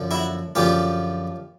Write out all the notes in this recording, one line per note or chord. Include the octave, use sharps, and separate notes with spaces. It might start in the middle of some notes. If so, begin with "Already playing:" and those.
Already playing: F#2 D3 F3
E4 F#4
F#2 D3 F3 F4 G4